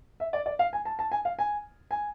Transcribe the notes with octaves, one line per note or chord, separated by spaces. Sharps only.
E5
D5
D5
F5
G#5
A5
A5
G#5
F5
G#5
G#5